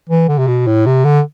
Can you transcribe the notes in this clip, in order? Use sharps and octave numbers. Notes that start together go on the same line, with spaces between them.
E3
D3
C3
B2
A2
C3
D3